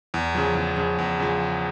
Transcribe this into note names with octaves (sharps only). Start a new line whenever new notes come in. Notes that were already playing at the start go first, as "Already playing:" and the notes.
E2
C#3 F3
E2
C#3 F3
E2
C#3 F3